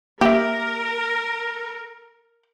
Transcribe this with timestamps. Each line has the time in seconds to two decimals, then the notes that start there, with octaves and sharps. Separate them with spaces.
0.21 A#3 G4 A#4 E5